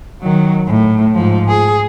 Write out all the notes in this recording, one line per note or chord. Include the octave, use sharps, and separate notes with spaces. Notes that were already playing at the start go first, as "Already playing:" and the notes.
D#3 F#3
A2
G#2 F3
G#4